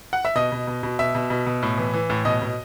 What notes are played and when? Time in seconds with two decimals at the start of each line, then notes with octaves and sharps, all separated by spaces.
0.13 F#5
0.25 E5
0.35 B2 D#5
0.52 B2
0.67 B2
0.83 B2
0.99 B2 E5
1.15 B2
1.30 B2
1.46 B2
1.62 A2
1.78 E3
1.94 E3
2.10 A2
2.25 B2 D#5
2.41 B2